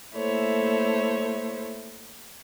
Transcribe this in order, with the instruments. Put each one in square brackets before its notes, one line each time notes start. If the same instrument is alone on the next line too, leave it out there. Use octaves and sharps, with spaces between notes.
[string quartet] A3 A#3 E4 A4 C5 C#5